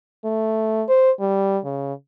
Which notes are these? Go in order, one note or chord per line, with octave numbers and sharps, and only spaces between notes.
A3
C5
G3
C#3